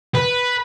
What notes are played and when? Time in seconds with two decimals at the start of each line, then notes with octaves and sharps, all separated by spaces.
0.15 B4